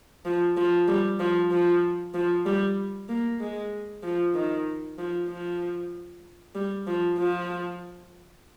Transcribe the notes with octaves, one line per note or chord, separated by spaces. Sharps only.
F3
F3
G3
F3
F3
F3
G3
A#3
G#3
F3
D#3
F3
F3
G3
F3
F3